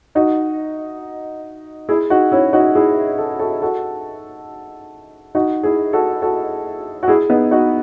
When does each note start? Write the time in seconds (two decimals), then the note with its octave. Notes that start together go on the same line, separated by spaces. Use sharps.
0.15 D#4 F#4
1.89 E4 G#4
2.10 D#4 F#4
2.32 C#4 E4
2.53 D#4 F#4
2.75 E4 G#4
3.18 A4
3.39 F#4 A4
3.62 F#4 A4
5.35 D#4 F#4
5.63 E4 G#4
5.93 F#4 A4
6.22 F#4 A4
7.03 F#4
7.08 E4 G#4
7.30 B3 D#4
7.51 D#4 F#4